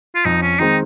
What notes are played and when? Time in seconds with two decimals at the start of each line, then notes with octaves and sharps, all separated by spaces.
0.15 F4
0.25 F2 D#4
0.42 C#4
0.59 D#3 G#3 C4 D#4